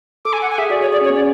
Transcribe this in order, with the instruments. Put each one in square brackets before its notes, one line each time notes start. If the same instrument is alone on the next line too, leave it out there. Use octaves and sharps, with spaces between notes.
[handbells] A4 [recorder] D6
[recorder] G#5
F#5
G#5
[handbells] G#4 [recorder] E5
[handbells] F#4 [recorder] D5
[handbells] G#4 [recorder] C#5
[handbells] G#4 [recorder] D5
[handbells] C#4
[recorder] C#5
[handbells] B3
[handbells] C#4 [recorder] D5